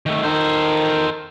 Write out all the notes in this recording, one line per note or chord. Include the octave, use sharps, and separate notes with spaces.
D#3 A3
D#3 A4 C5